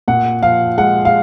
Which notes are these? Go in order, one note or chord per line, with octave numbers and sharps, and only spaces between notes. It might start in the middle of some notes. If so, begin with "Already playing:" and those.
A#2 F#5
F3 F5
G#3 F#5
F5